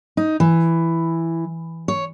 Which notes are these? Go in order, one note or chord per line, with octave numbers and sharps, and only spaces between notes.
D#4
E3
C#5